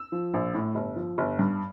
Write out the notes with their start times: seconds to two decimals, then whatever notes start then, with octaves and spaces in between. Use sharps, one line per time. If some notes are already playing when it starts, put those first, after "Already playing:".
Already playing: E6
0.12 F3
0.34 A#1
0.54 A2
0.75 G1
0.96 F3
1.18 G1
1.39 G2